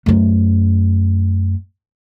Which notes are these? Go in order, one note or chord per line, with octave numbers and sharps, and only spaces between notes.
F#2 A3